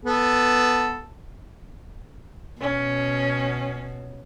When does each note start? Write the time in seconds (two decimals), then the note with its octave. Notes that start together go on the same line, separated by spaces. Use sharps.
0.05 B3 A4
2.61 B2 C#4